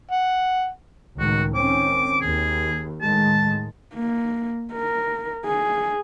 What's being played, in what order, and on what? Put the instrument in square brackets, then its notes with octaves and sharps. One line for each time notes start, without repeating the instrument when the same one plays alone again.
[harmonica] F#5
[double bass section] C#2 A2 D#3 [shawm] F#4
[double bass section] D#3 C4 C#4 [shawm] D6
[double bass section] D#2 [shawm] G#4
[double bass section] A2 D#3 G#3 [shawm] A5
[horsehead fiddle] A#3
A#4
G#4